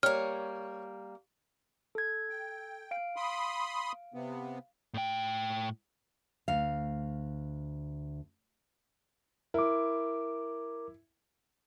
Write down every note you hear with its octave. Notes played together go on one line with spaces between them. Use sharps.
G3 A#3 C#5 F6
A4 G#6
G5
F5 D7
B5 C6 D#6
C3 B3
A2 G5
D2 F5
E4 A#4 D6